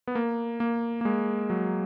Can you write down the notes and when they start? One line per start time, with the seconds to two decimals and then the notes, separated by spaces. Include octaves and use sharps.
0.07 B3
0.15 A#3
0.60 A#3
1.01 A#3
1.05 G#3
1.50 F#3